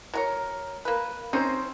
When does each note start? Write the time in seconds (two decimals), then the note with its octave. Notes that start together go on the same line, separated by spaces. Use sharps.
0.14 F#3 A#4 C#5
0.85 A#3 B4
1.33 C4 C#4 D#4 C5